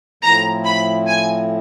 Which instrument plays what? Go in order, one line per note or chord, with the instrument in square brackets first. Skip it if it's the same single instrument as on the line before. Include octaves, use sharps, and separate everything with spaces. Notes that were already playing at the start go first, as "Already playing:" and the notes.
[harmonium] A2 F3 A3 C4 E4 [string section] A#5
[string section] B5
G#5